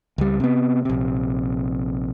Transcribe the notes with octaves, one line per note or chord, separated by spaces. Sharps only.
C#2 G3
C3 B3
A#1 C3